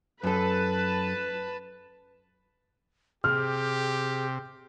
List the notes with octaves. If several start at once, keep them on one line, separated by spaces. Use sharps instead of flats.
F#2 A4 B4 A5
C3 G4 G#4 F6